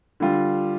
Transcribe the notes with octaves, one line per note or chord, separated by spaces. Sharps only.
D3 G3 F4